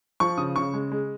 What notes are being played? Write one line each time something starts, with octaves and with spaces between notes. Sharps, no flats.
F3 C#6
C#3 D#6
C#3 C#6
G#3
G#3